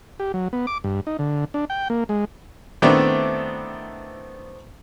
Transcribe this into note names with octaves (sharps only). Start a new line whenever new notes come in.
G4
F#3
B3
D6
G2
D#4
D3
D4
G5
A#3
G#3
D#3 A3 B3 C4 D4 E4